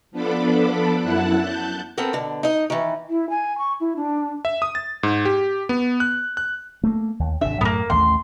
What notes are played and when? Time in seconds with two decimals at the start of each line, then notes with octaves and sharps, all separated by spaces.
0.11 F3 B3 D4 A4 B5 D6
1.00 F#2 E4 F#5 A5 F#6
1.40 A5 F#6 G6
1.97 B3 C4 A4 A#4
2.13 B2 D3
2.43 D#4 D#5
2.70 D#3 E3
3.10 E4
3.30 G#5
3.58 C#6
3.80 E4
3.96 D4
4.45 E5
4.62 D#6
4.75 A6
5.03 G#2
5.25 G4
5.69 B3
6.00 F#6
6.37 F#6
6.84 A3 A#3
7.20 D#2
7.41 G#1 C3 D4 E5
7.61 F#2 A2 A#3 B3
7.90 A1 D#2 A3 C6